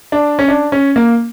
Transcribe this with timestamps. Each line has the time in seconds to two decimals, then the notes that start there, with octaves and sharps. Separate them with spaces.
0.12 D4
0.39 C#4
0.48 D4
0.72 C#4
0.96 A#3